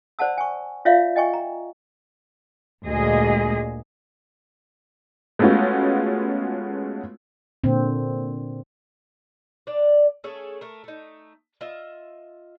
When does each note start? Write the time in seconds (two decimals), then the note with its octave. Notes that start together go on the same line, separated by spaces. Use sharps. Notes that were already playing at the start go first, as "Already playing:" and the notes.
0.19 C5 D5 F#5 A5 E6
0.38 G#5 C#6
0.85 F4 C#5 D5 E5 F5
1.16 D#5 G5 G#5 C#6
1.33 A#5
2.84 D2 A#2 G#3 G#4 D#5
5.39 G#3 A3 B3 C#4 F4 F#4
7.64 A#2 D3 C4
9.67 D4 D5
10.24 A3 C#4 G#4 A4
10.61 A3 A#4
10.84 A3 D#4
11.61 F4 D#5 E5